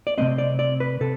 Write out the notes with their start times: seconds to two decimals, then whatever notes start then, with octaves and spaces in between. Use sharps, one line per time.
0.07 D5
0.18 C3 F3 A3 C4 D#5
0.38 D5
0.59 D5
0.80 B4
1.01 C3 A4